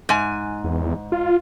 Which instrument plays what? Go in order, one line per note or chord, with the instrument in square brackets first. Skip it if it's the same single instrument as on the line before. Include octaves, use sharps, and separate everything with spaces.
[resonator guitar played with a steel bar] G#2 G#5
[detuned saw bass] E2
F4